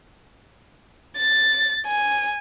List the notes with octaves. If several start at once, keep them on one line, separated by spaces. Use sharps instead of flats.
A6
G#5